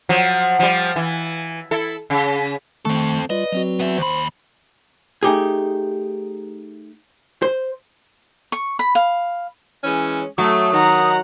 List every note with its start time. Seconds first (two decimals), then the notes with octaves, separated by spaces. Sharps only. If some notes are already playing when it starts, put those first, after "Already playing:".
0.09 F3 F#3
0.59 F3 G3
0.96 E3
1.71 E4 A4
2.10 C#3
2.85 D#3 A3 C4 A4 C#6
3.30 G3 F4 B4 D5 D#5
3.53 F#3 C4 F#4
3.80 B3 E5
3.98 D#2 C5 B5 C6
5.23 A3 D#4 G4 G#4
7.42 C5
8.52 C#6
8.79 B5
8.95 F5
9.84 E3 G#3 C#4
10.38 F#3 A3 D#6
10.72 D#3 F#5 A#5